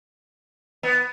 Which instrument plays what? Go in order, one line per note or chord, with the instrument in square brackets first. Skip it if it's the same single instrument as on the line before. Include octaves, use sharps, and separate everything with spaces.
[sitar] B3